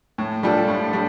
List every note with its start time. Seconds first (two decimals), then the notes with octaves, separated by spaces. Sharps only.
0.18 A2
0.43 G3 D4 F4 A4
0.68 A2
0.93 G3 D4